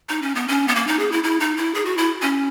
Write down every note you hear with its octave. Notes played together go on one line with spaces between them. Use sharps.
D#4
C#4
B3
C#4
B3
A#3
D#4
G#4
E4
E4
D#4
E4
G#4
F#4
E4
C#4